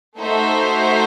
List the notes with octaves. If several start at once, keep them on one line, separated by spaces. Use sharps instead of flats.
A3 D#4 F#4 C5 E5